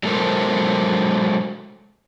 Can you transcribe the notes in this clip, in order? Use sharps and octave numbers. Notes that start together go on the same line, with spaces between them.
F#3 G#3 A4 A#4 C5